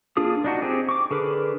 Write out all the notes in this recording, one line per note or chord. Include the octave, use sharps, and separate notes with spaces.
A#3 D4 F4 G#4 D#6
D4 D#4 F#4
C4 G4 G#4
C#6 D6
D3 G#4 A#4 B4